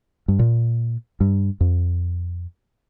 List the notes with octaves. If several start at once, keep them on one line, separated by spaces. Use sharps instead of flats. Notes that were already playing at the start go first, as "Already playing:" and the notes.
G2
A#2
G2
F2